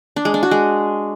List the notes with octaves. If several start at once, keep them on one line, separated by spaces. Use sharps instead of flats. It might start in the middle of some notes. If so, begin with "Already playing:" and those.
D4
G#3
D4
F#4
G#3